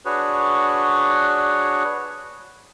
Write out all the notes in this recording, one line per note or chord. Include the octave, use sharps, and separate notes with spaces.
D4 F#4 G#4 B4 C#5